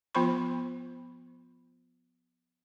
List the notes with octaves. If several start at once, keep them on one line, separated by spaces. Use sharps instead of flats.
F3 B3 F4 C5 B5 C#6